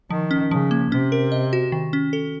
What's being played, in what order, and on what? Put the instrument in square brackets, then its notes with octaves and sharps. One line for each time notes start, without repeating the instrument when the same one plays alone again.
[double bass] D#3 [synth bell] F3
[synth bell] C#4
[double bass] C#3 [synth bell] F3
[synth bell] A#3
[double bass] C3 [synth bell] C#4
[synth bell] A#4
D#5
F#4
D#3
C#4
A4